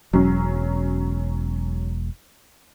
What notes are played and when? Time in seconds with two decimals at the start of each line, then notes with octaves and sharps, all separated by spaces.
0.13 E1 F#3 C#4